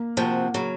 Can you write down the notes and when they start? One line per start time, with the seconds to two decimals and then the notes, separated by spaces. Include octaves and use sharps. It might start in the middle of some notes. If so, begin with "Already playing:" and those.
Already playing: A#3
0.17 C3 F3 A#3 C4 F#4
0.54 C#3 F#3